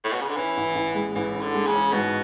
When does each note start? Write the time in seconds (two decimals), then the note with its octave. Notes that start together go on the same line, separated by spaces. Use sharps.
0.04 A2
0.13 B2
0.21 C#3
0.28 D3
0.37 E3 C#4
0.57 A1
0.75 A1
0.95 G#3
1.15 A1 E3
1.34 C#4
1.41 D3
1.54 G#3
1.67 C#3
1.73 C#4
1.92 G#2 B2